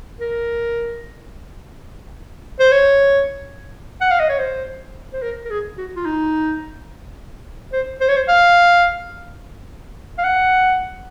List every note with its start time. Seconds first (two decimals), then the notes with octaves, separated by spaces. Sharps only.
0.20 A#4
2.60 C5
2.72 C#5
4.01 F#5
4.11 F5
4.20 D#5
4.29 C#5
4.38 C5
5.13 C5
5.22 A#4
5.45 A#4
5.50 G#4
5.78 F#4
5.96 F4
6.06 D#4
7.73 C5
8.01 C5
8.09 C#5
8.16 C5
8.28 F5
10.18 F5
10.24 F#5